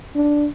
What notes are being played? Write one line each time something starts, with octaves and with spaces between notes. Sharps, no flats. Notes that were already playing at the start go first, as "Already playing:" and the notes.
D4